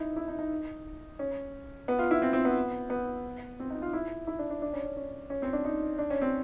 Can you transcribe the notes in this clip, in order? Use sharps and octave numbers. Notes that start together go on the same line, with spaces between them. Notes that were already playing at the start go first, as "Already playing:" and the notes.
Already playing: D#4 E4
E4
D#4
D#4
C#4
B3
F4
E4
C4
C4
B3
B3
C4
D#4
F4
E4
E4
D4
D4
D4
C#4
C#4
C#4
C#4
C4
D4
D#4
D4
C#4
C4